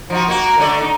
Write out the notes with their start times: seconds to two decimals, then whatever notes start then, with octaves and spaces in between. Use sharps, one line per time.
0.10 F3 D#4 F#4
0.28 A#3 F#4
0.58 D3 A3 D5
0.80 D#4